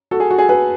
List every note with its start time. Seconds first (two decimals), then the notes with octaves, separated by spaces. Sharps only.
0.11 F#4 A4
0.20 G#4
0.30 F#4
0.38 G#4
0.49 G#4 B4